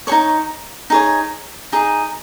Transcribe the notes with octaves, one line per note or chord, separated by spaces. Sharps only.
D#4 G#4 C#5 C#6
D#4 G#4 C#5
D#4 G#4